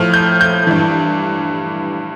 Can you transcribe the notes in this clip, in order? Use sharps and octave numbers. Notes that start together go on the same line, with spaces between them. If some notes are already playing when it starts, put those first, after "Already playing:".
Already playing: A2 F3 F6
G6
G6
G2 E3